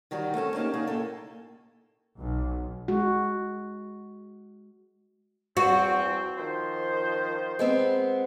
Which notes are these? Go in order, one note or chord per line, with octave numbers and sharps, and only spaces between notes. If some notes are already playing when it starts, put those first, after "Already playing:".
D#3 F#3 G3 F#4
A3 C4 C#4 A4
A#3 C#4 D#4 G4 A5
C#3 F#3 A#3 D#4 G#4
A2 A#3 A4
B1
G#3 F#4
E2 C4 F#4
D#3 F3 C5
G#3 B3 C4